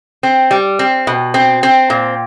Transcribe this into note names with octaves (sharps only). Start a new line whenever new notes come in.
C4
G3
C4
B2
C4
C4
A#2